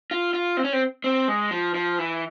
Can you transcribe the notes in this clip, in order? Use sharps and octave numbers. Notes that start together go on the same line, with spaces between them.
F4
F4
C4
C#4
C4
C4
G#3
F3
F3
E3